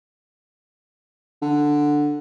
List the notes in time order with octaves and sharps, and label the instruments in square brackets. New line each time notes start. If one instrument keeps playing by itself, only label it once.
[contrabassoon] D3